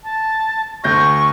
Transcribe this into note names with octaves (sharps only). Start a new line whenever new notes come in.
A5
D2 C#6 G6 A#6